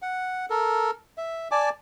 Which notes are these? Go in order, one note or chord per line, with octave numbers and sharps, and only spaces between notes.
F#5
A4 A#4
E5
D5 G#5 A5 D6